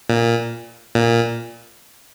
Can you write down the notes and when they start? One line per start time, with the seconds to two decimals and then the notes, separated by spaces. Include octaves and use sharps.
0.09 A#2
0.95 A#2